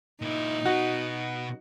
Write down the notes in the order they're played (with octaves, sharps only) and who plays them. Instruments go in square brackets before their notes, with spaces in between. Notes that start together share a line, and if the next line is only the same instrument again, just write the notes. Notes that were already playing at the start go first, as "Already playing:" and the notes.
[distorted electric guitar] A#2 E4 [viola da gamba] D#4
[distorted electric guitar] B2 B3 [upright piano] F#4